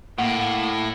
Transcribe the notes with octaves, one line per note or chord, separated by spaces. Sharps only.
A2 A#3 F#5